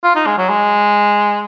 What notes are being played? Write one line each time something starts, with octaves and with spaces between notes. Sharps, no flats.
F4
D#4
G#3
F#3
G#3